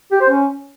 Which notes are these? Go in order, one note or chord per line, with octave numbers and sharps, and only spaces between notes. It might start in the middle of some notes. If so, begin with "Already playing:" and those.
G4
C5
C#4